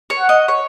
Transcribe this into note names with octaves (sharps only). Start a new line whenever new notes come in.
C#5
F#5
D#5
C#5